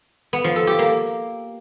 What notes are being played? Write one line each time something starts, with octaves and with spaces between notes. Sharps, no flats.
B3
F3
A4
G4
A#3